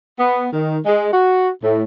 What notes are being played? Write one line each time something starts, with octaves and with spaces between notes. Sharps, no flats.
B3
D#3
G#3
F#4
A2